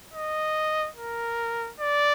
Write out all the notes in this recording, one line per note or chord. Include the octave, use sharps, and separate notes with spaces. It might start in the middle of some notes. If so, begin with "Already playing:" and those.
D#5
A#4
D5